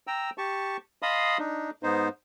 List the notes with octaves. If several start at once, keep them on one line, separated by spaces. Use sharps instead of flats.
G5 A#5 E6
G4 A5 C#6
D#5 F5 A5 B5 C6 D#6
D4 D#4
G#2 B3 D#4 C5